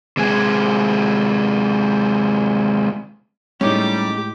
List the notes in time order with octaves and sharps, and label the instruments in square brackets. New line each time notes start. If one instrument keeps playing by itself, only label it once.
[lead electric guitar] C3 G#3
[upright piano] A2 G#3 [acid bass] G3 [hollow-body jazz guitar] C#4 D#4 [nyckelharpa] G4 D6